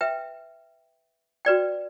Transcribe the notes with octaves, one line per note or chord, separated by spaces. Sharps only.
B4 E5 G5
F#4 B4 D5 G5